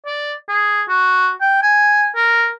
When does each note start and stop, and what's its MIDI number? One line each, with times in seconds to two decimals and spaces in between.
0.06 0.33 74
0.49 0.83 68
0.89 1.30 66
1.41 1.58 79
1.62 2.09 80
2.15 2.50 70